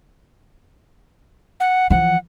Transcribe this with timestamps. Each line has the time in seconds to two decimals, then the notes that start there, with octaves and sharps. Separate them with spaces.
1.60 F#5
1.90 E3 F3 F#5